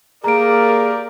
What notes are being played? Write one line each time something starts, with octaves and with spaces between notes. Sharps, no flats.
A#3 G4 G#4 A#4 D5 A#5 D7